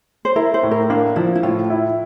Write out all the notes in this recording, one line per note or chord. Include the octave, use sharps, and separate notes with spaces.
C5
E4 A#4
C5
A2
A#4
A#3 D4
F3 E4
E4
A2 F4
E4